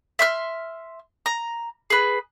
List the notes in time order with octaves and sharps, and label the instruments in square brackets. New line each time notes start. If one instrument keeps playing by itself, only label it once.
[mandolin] E5 C6 F6
A#5
G#4 B4